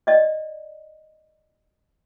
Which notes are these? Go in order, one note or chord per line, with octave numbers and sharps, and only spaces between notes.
D5 D#5